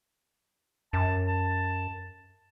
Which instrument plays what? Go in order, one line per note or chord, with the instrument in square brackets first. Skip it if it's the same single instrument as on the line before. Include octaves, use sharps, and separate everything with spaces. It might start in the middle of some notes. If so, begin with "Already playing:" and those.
[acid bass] F#2 [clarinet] A5
[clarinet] A5